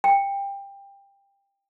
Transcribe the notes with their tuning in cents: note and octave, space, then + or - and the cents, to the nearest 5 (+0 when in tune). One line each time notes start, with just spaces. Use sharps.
G5 +20